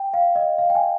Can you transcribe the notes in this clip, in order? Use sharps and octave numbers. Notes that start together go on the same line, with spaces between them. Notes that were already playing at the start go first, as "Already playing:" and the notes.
Already playing: G5
F5
D#5
F5
G5
G#5